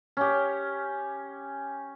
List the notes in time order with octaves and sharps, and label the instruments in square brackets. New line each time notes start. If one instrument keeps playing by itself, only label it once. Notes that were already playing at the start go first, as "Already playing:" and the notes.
[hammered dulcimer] C#4 G4